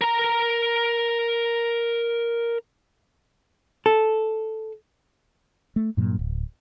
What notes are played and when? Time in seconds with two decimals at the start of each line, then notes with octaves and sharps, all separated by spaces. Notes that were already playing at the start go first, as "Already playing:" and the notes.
0.01 A#4 A#5
3.86 A4
5.76 A3
5.97 G2 A#2 F#3
6.19 D1